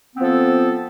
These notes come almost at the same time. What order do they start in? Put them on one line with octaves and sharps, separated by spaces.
B3 C4 F3 A4